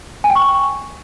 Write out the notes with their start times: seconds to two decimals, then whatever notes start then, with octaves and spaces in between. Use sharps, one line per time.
0.24 G#5
0.30 G5
0.35 C#6